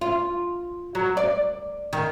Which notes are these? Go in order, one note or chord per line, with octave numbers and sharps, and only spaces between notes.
F4
F#3
D5
D#3